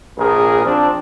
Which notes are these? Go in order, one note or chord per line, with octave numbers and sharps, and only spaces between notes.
A#1 A#2 G#4 A#4
F3 C4 D4